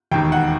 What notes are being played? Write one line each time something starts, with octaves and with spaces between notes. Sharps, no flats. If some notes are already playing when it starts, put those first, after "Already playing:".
E1 D#2 D#3 G5
F#5